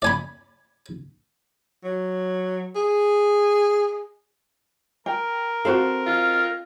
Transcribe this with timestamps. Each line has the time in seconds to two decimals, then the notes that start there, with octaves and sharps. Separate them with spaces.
0.02 D5 G#5 B5
1.84 F#3
2.76 G#4
5.06 A#4 G5
5.65 C4 F#4 A4 C5 F5
6.06 F4